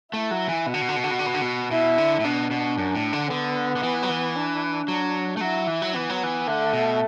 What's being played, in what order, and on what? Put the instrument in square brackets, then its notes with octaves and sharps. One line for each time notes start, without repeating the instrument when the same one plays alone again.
[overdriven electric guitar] A3 [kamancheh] E4
[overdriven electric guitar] F#3
E3
[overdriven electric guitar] B2 [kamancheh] F#4
[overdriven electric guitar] D3
B2
D3
B2
D3
B2
D3
B2
D3
B2
[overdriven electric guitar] B2 [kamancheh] E4
[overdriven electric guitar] D3
A2
[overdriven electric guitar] B2 [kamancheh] D4
[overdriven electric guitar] B2
F#2
A2
D3
[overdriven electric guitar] D3 [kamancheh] B3
[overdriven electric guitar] D3
E3
F#3
E3
[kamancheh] D4
[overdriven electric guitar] F#3
A3
[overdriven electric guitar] F#3 [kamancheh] E4
[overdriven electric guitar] E3
F#3
[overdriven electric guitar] E3 [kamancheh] B3
[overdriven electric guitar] F#3
E3
[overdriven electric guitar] D3 [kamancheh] A3
[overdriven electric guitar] B2